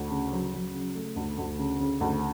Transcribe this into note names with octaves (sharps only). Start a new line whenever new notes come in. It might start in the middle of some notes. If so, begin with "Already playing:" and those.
Already playing: D2
C#3
F#3
F#3
C#3
A3
D2
D2
C#3
C#3
D2